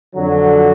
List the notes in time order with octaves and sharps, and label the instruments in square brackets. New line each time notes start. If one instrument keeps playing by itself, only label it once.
[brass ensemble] F2 D3 F#3